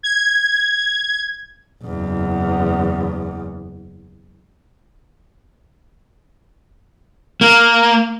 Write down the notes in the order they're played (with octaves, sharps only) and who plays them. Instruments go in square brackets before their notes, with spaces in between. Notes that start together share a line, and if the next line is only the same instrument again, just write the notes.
[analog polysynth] G#6
[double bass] F#1 E2
[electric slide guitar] A#3